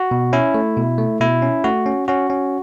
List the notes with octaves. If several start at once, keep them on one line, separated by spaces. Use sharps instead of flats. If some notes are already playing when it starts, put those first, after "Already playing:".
Already playing: F#4
B2
C#4 E4
A3
B2
A3
B2 E4
C#4
A3 F#4
C#4
C#4 F#4
C#4